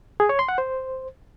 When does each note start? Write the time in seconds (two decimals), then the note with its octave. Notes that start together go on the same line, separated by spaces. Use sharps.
0.20 G#4
0.29 C#5
0.39 C6
0.49 F#5
0.58 C5